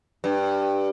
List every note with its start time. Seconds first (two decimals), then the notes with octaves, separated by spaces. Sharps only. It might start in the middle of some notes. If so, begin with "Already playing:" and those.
0.24 G2